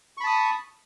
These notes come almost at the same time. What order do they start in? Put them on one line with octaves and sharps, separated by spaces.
C#6 B5 A5 D#6